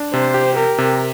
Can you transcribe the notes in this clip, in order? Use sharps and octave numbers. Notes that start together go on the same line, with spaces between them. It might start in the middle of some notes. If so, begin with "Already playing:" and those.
Already playing: D4
C3 C5
G4
G4 A#4
C3